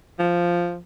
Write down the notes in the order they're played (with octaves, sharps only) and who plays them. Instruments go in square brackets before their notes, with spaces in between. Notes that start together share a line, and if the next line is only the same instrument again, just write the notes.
[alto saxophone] F3